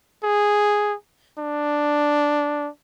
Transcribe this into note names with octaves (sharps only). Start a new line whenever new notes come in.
G#4
D4